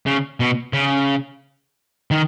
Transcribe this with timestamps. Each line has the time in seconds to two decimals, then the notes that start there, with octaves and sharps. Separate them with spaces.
0.06 C#3
0.40 B2
0.73 C#3
2.11 D#3